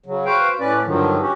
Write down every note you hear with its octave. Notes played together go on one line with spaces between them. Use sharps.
C#3 F#3
F#4 B4 C5 F5 G5
A2 C#4 B4 D5
G2 D3 D#3 F3 F#3
C#4 F#4 G4